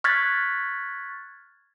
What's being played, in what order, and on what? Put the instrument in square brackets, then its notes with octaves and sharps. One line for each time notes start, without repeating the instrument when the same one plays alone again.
[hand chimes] C#6 F6 F#6 G#6 A6 B6